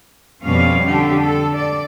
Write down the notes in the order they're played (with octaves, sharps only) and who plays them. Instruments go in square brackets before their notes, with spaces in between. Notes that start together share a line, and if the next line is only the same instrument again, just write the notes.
[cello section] F2 B2 G3 C#4 F5
D3 G4 A4
A4
D5